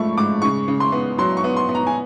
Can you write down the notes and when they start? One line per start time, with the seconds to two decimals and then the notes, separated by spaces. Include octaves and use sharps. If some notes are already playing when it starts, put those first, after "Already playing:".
Already playing: G#2 F3 A3 B5 C#6
0.17 G#2 D6
0.42 C#3 C#6
0.68 C#3
0.80 C6
0.92 B3
1.18 F#3 C6
1.37 C#6
1.44 B3
1.57 C6
1.69 B3
1.75 A#5
1.87 G#5